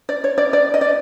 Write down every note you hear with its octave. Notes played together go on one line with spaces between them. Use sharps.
D5
C#5
D5
D5
D#5
D5